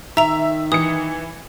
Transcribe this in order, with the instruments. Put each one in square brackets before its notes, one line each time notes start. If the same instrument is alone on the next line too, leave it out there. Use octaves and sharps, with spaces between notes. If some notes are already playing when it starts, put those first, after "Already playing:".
[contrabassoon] D#3 [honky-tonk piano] E5 [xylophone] A#5 F7
[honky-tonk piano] E3 C#7 [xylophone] D#6